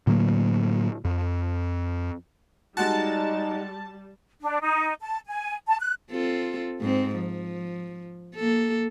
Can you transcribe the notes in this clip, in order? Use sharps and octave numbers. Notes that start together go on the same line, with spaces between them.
A2 D3 F#3 A#3
F2
G3 G#3 D#4 F#4 A5
D4
D#4
A5
G#5
A5
F#6
C4 F4 A4
G#2 C4
F3
A#3 A4